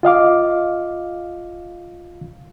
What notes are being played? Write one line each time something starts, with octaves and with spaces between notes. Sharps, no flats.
F4 D#5 F5 D6